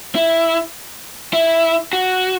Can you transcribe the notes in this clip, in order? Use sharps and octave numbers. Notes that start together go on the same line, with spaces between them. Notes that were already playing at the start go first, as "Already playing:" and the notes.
E4
E4
F#4